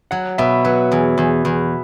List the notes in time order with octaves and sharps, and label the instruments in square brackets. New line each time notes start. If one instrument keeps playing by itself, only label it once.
[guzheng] F#3 [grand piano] F#5
[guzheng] B2 [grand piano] E5
[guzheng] F#3 [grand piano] B4
[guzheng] E2
E2
E2